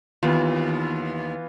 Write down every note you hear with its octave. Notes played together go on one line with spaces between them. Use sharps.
D#2 E3 B3 F4